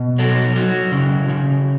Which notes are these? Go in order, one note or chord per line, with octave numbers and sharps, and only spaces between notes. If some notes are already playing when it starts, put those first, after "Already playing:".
Already playing: B2
F#3 A4
F#3
C#3
C#3